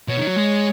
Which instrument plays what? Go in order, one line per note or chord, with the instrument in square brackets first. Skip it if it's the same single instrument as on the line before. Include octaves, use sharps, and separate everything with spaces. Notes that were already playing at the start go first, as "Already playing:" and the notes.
[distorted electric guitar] B2 [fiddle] C#5
[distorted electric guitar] D#3
F#3
G#3